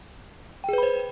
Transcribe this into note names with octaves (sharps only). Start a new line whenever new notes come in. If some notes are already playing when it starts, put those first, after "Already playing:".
G#4 B4 C5 G5 B5